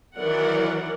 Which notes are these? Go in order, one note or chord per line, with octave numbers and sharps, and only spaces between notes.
D#3 E3 F#3 A#4 D5 F#5